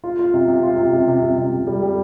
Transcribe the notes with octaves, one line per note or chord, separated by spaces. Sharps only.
F4
F4
C3
C3
F4
C3
C3
C3
C3
C3
C3
G3
G3